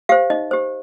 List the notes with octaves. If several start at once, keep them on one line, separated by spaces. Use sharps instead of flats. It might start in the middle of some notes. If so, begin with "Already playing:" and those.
G4 C5 F5
D#4 D#5
G4 C5